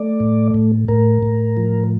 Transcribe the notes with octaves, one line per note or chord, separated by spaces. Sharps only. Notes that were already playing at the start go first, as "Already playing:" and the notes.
Already playing: A3 D5
A2
A2
A2 A#4
A2
F3